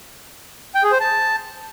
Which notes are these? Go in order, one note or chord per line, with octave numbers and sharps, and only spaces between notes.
G5
G#4
C5
A5